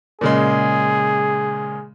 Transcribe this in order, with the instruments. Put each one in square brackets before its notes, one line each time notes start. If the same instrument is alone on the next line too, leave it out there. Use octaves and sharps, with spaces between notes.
[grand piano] A#2 C#3 G#3 [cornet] G#4